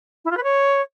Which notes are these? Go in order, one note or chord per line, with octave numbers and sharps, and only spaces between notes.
E4
F4
B4
C#5